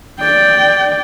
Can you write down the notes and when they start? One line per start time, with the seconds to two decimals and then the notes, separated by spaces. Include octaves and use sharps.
0.20 D5 G5